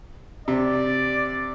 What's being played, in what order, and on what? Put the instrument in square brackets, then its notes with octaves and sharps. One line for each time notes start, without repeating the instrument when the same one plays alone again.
[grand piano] C3 [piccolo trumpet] D5